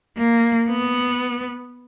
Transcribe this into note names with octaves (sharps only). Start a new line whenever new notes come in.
A#3
B3